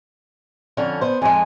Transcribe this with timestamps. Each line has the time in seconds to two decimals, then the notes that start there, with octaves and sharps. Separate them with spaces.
0.77 F2 D3 C#4
1.01 B3 C5
1.22 F2 G#3 G#5